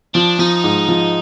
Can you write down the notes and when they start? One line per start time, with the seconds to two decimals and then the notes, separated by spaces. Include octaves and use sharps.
0.14 F3 D4
0.39 F3 D#4
0.64 G#2
0.89 F3